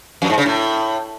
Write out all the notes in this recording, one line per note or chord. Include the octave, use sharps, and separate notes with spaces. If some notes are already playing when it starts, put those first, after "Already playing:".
F2
G#2
C#3
A2